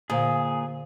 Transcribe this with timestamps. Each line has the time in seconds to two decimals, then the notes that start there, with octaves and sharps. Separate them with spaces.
0.10 A#2 D3 G#4 C5 F5